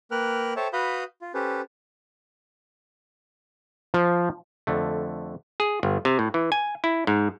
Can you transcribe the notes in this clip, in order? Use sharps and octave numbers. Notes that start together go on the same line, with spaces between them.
A#3 A#4 B4 G5 F6 F#6
A4 C5 C#5 E5 G5 A5
F#4 B4 F5 B5 D#6 G6
F4
C#4 G4 A4 B4 C5
F3
F2 D3 A3
G#4
G1
C3
A2
E3
G#5
E4
G#2